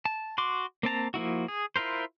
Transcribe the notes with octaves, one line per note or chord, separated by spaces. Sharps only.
A5
F#4 C6 D6
A#3 C4 A5 A#5
F3 A#3 E4 F#4
G#4
E4 F4 A#4 C5